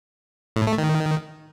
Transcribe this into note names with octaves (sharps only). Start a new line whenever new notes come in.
A2
A3
D#3